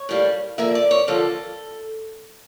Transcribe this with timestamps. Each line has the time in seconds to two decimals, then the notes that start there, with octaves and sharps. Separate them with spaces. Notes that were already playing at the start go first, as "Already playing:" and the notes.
Already playing: C#5
0.09 A2 G3 A#3
0.58 D3 F3 A#3 E5
0.75 D5
0.91 C#5
1.08 D3 F3 A#3 A4